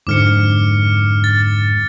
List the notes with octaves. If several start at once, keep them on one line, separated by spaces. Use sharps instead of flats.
F2 G#2 D3 D6 F6 C#7
A6